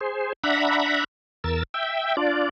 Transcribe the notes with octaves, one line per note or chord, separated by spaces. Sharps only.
G#4 C5
D4 E5 F#5 A#5 B5
E2 A#4 E6 A6
E5 G5
D4 F4 D5